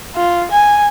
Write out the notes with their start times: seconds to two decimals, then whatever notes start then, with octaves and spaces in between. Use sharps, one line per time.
0.15 F4
0.51 G#5